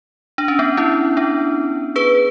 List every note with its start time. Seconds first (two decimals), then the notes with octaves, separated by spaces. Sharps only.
0.38 D4
0.48 C#4
0.59 B3 D4
0.77 C#4 E4
1.17 B3 D4
1.96 G#4 B4